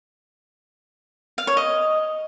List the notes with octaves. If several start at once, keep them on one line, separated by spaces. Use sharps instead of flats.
F5
C#5
D#5